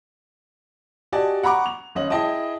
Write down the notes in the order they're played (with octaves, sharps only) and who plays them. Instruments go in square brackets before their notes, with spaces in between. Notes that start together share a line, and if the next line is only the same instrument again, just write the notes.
[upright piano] F#4 G4 D5 D#5 G#5 A5
F#5 A#5 B5 C#6 D6
F7
G#1 C#4 D#5 F#7
E4 G#4 D#5 G5 A5 D#6